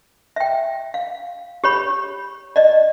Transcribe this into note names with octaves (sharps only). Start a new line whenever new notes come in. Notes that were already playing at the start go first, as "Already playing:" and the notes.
E5 G5
F5
G4 C#5 B5
D5 D#5